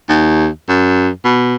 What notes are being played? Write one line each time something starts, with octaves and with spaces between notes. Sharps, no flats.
D#2
F#2
B2